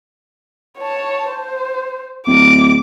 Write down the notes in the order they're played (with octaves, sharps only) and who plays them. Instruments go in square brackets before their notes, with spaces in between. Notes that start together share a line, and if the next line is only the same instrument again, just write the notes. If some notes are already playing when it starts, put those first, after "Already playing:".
[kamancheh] C#5 A5
C5
[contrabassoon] D1 [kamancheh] D6